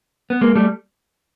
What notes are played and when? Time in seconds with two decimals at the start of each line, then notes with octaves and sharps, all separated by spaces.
0.30 B3
0.41 G#3 A#3
0.55 G3 A3